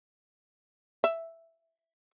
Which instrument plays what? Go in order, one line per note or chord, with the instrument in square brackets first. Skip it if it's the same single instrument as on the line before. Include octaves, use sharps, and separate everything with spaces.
[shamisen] E5